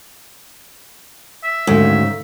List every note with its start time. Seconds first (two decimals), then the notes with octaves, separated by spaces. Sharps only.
1.44 E5
1.67 D2 G#2 C#3